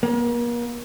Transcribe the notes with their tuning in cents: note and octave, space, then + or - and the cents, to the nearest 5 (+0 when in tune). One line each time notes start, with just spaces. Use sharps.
A#3 +40